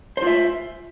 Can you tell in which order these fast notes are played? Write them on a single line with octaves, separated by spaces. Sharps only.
C5 F4 E5